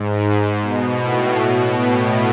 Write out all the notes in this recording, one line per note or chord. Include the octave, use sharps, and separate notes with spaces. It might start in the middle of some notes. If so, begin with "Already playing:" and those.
Already playing: G#2
B2
A2
B2
A2